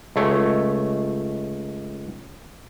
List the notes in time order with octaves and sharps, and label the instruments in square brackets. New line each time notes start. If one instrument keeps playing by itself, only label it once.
[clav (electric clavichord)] C#2 A3 C#5